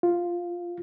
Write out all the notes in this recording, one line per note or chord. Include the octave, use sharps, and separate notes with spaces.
F4